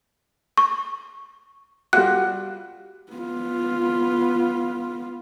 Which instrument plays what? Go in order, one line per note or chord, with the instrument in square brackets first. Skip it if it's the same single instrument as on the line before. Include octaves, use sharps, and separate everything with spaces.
[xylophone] C#6
[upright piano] G3 F4 F#4 [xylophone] F#6
[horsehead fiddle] B3 F4